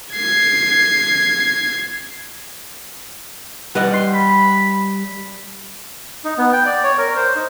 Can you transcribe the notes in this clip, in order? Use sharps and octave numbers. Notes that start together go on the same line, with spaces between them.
G#6 C7
G3 B4 D#5 F#5
C6
B5
D#4
B3
G5
D5
C#5
A#4
C5
D#4